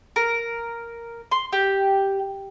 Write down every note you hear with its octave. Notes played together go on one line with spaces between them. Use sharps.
A#4
C6
G4